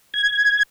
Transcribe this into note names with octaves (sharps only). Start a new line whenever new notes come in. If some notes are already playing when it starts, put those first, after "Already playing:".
G#6